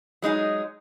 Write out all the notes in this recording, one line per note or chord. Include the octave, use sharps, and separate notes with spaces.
F#3 G#3 D#4 G#4